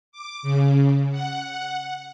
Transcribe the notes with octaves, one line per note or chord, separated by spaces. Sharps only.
D6
C#3
F#5